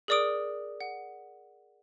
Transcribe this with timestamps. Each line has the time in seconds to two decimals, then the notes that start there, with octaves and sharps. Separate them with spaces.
0.08 G#4 A#4 D5 D6 D#6 D7
0.81 F#5